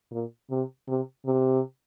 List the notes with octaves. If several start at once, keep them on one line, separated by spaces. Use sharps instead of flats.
A#2
C3
C3
C3